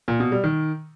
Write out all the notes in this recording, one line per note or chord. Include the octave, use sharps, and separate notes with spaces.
A#2
B2
G3
D#3